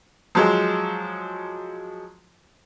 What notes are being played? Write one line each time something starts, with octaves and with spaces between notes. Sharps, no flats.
F3 F#3 G#3